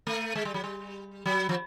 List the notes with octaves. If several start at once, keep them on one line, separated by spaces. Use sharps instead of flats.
A3
G#3
G3
F#3
G3
F#3
F3